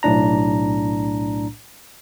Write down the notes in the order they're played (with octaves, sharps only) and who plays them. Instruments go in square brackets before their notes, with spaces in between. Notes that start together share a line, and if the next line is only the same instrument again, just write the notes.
[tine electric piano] B1 A2 D4 A#5